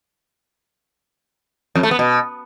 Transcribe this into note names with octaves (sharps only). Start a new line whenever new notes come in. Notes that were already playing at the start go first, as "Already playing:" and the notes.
F2
A3
B3
B2